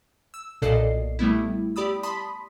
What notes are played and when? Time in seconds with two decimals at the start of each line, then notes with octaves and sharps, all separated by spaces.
0.34 E6
0.62 B1 A#2 A4 D5 D#5 C7
1.19 G3 A3 B3 E4
1.76 G4 D5 B5 D#6 E6
2.03 A5 B5 C6 D#6 B6